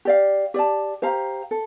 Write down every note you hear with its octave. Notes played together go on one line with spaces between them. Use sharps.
G4 D5 F5
G4 D5 A5
G4 C5 F5 A#5
A4